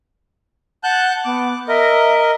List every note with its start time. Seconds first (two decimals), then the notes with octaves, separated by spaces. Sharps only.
0.83 F#5 A5 F#6 G6
1.25 B3 D6
1.68 A#4 D#5 E5